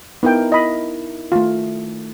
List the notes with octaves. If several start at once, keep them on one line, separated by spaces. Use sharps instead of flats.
B3 D#4 E4 A#4 G5
E4 D#5 B5
D#3 A3 F4